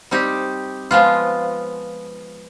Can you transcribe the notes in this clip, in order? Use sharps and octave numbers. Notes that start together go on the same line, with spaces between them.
G3 C4 D#4 G4
F3 G#3 B3 F4